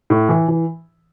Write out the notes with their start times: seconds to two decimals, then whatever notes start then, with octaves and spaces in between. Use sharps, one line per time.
0.10 A2
0.29 E3
0.48 E3